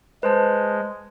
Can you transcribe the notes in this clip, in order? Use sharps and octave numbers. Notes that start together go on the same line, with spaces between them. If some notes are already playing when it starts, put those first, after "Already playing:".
G#3 B4 C5 A5